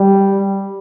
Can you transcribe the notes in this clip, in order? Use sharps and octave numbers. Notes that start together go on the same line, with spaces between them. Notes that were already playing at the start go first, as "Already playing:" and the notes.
Already playing: G3